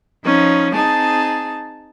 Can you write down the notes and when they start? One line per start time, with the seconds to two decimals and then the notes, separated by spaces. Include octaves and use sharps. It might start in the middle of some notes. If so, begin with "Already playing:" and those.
0.25 F3 C#4 D#4
0.73 C4 D#4 G#4 A5